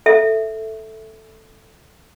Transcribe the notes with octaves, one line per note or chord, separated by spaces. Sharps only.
A4 E5